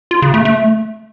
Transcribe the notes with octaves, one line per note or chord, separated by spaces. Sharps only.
F4
C#3
A3
A3